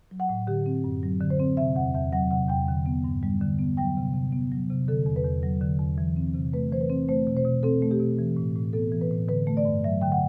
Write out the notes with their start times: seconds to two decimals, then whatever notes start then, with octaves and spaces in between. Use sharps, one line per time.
0.11 F#3
0.20 F#5
0.29 A2
0.47 D3 G4
0.66 C4
0.84 F#2
1.03 F#3
1.21 D3
1.30 C5
1.40 C4
1.57 C3 E5
1.75 E2 F#5
1.94 E2 E5
2.13 F#3 F#5
2.31 C3 F#5
2.49 E2 G5
2.68 D3
2.86 B3
3.04 G2
3.23 G3
3.41 D3
3.59 B3
3.77 F#3 G5
3.97 C3
4.14 C3
4.32 B3
4.51 F#3
4.70 C3
4.88 D3 A4
5.06 E2
5.16 B4
5.24 E2
5.43 F#3
5.61 D3
5.79 E2
5.98 E3
6.16 C4
6.34 C3
6.53 A3 B4
6.72 E3 C5
6.81 B4
6.89 C4
7.08 A3 C5
7.27 B2
7.37 C5
7.45 B2
7.63 C4 A4
7.82 A3
7.91 G4
8.00 B2
8.18 E3
8.37 A2
8.55 A2
8.73 B3 A4
8.92 E3
9.01 B4
9.11 A2
9.28 D3 B4
9.47 A3
9.57 D5
9.65 G2
9.84 F#3 E5
10.01 D3 G5
10.12 F#5